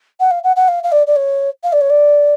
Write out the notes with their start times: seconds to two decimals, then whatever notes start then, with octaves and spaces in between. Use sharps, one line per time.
0.20 F#5
0.31 F5
0.44 F#5
0.56 F#5
0.68 F5
0.83 F5
0.92 D5
1.07 D5
1.16 C#5
1.64 F5
1.73 D5
1.81 C#5
1.90 D5